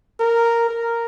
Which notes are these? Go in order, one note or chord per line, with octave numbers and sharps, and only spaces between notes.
A#4
A#4